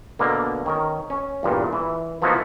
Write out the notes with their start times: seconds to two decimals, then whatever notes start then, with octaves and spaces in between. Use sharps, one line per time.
0.19 B2 D3 A#3
0.66 D#3 C#4 A#4
1.10 C#4
1.43 E2 G2 A#2
1.73 E3
2.22 E3 F3 A#3 B3 D#4 F#4